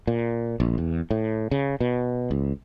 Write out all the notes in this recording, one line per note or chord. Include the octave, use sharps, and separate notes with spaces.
A#2
A#1
E2
A2
C#3
B2
C#2